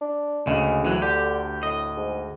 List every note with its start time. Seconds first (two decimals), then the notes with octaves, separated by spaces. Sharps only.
0.01 D4
0.47 D2 C#3 G#3
0.85 E3 F#3
1.02 D3 G4
1.63 A2 D#5
1.97 G#2